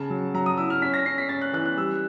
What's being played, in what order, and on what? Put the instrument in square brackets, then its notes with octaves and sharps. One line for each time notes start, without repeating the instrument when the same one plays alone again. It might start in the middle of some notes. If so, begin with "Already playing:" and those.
Already playing: [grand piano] C#3 A5
F#3
F#3 A#5
D#6
E4 E6
F6
C#4 B6
A#6
C#4 C7
B6
C#4 A6
F#6
E3 F#6
F#6
G3 E6